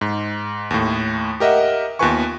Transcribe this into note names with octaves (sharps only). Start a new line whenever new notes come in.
G#2
D#2 A2
G4 A#4 D#5 E5 F#5
D#2 B3 F4 B4 G#5 C#6